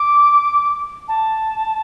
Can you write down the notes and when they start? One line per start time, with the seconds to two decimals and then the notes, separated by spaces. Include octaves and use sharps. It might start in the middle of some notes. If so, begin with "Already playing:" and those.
Already playing: D6
1.08 A5